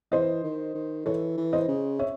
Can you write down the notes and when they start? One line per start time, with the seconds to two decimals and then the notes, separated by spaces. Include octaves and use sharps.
0.12 E3 C5 D#5
0.43 D#3
0.75 D#3
1.06 E3 A4 C#5
1.37 E3
1.53 C5 D#5
1.68 C#3
1.99 C#5 E5